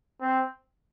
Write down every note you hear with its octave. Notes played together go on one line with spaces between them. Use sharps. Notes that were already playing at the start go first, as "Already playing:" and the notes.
C4